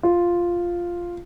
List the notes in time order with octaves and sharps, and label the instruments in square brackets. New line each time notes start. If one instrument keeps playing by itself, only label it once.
[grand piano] F4